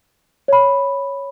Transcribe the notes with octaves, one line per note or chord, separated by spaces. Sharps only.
C#5 B5